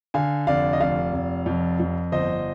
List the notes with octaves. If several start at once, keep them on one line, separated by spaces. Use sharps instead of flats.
D3 F5 G#5
F1 D5 F5
D#5
F1 D5 F5
F1
F2
F2
G1 C5 D#5